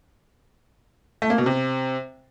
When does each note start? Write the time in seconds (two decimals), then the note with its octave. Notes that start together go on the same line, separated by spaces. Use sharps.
1.22 A3
1.30 A#3
1.38 B2
1.46 C3